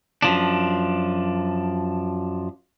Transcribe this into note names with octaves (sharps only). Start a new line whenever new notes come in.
F#2 F3 D4